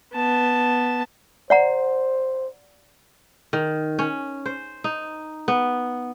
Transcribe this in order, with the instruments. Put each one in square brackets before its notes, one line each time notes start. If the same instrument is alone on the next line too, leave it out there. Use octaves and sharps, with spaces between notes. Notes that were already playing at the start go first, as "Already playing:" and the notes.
[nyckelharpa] B3 A5
[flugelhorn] C5 [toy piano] D5 F#5 A#5
[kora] D#3
C#4
C5
D#4
B3